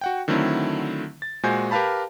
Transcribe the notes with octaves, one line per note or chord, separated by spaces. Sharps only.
F#4 F#5 G5
D3 D#3 F#3 A3 C4 E4
A6
A#2 G#3 F#4 C5 G#5 G6
G4 A#4 B4 F5 A5 B5